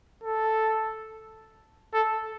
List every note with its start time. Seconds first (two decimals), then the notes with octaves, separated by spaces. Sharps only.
0.24 A4
1.94 A4